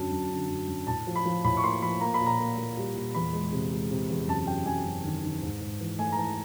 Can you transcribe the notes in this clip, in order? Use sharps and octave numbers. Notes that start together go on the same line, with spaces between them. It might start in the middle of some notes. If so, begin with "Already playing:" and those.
Already playing: F#2 D3 F#3 A5
F#2
D3
F#2
F#2
A2 A5
F3
B5
F3
A2 B5
C#6
A#3 C6
F3 B5
A#3 A#5
B5
A#2
A#5
A#3
A#3
G3
A#2
E2 B5
G#3
C3
G#3
C3
E2
F#2 A5
F#2 G5
F#2 G#5
F#2
D#3
D#3
G#2
G#2
E3
A3 G#5
A#5
E3 A5